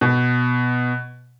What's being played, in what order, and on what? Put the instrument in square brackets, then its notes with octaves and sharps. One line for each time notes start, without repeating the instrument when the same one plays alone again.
[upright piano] B2